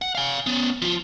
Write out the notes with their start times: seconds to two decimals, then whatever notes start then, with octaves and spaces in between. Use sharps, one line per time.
0.02 F#5
0.15 F5 G#5
0.47 B3 C#4
0.82 F3 F4